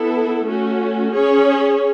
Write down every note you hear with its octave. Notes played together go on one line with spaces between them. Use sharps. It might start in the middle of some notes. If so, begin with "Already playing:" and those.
Already playing: B3 E4 A4
A3 C#4 F#4
C#4 G#4 C#5